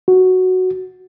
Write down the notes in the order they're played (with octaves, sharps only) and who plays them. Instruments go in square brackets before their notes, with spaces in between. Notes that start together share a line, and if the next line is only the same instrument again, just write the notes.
[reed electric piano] F#4